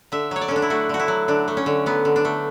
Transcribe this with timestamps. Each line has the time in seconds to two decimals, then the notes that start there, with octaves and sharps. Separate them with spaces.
0.12 D3 E5
0.31 F#3 C#5
0.41 D5
0.48 D3 C#4
0.56 D4
0.62 E4
0.70 A3 F#4
0.89 D3 F#4
0.99 E4
1.08 F#3
1.28 D3 D4
1.48 A3
1.57 C#4
1.66 D3
1.86 F#3 B3
2.05 D3
2.16 D4
2.25 A3